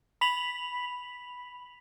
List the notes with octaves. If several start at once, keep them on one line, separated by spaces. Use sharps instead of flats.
B5 B6 F7 F#7